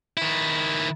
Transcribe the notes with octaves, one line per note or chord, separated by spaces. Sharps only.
D#3 E4